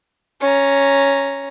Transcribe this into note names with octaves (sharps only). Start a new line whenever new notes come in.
C#4 A#5